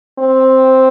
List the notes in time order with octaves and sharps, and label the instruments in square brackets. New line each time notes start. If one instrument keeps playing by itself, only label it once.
[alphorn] C4